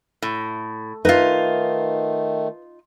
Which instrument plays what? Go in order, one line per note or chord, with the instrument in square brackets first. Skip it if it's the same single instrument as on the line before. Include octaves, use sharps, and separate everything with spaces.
[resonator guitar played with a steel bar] A2
[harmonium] D#3 A3 [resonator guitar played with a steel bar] D#4 F4 [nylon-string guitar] B4 E5